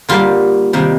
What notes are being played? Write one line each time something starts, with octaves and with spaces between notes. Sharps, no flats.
D3 G3 A#3 F4
C3 D#3 G3 A#3